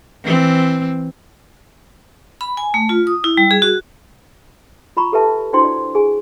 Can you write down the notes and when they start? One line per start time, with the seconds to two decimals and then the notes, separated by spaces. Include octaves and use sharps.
0.24 E3 C4
2.41 B5
2.57 G#5
2.74 A3
2.89 F4
3.07 D#6
3.24 E4
3.37 G3
3.51 G#4
3.62 F#4
4.97 F4 A#5 B5 C#6
5.12 G4 A4 B4 E5 A5
5.53 D4 E4 F#4 C5 G5 C6
5.64 D5
5.95 G#4 G#5